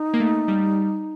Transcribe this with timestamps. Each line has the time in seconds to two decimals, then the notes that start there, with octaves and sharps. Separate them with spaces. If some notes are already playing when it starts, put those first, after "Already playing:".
Already playing: D#4
0.14 A#3
0.20 A3
0.48 G3